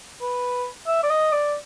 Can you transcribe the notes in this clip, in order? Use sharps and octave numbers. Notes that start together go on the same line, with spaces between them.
B4
E5
D5
D#5
D5